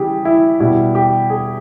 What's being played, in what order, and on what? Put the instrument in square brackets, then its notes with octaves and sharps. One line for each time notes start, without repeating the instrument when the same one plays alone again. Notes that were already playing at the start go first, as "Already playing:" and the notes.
Already playing: [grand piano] C#3 E3 G3 G4 G#4
E4
B2 G3 E4
G4
G#4